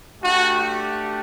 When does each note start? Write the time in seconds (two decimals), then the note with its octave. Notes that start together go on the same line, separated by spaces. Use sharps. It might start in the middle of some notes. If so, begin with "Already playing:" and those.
0.22 A3 D4 F#4 G4 F#5